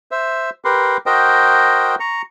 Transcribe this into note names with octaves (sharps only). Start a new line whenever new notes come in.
C5 E5
G4 A#4 B4 C6
F#4 A#4 C5 D#5 G5
A#5 C#6